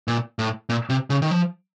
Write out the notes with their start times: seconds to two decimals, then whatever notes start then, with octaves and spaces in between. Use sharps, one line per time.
0.08 A#2
0.39 A2
0.69 A#2
0.89 C3
1.10 C#3
1.22 D#3
1.31 F3